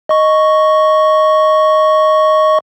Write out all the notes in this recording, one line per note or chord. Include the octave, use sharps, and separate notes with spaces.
D#5 C#6